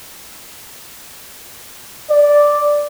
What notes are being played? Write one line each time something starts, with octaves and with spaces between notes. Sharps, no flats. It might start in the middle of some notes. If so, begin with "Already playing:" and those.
D5